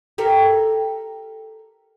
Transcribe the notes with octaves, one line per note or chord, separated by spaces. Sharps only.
G4 A4 A#4